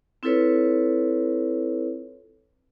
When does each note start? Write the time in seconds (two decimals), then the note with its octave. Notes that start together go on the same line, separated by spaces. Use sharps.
0.23 C4 E4 F4 A4 B4 C#5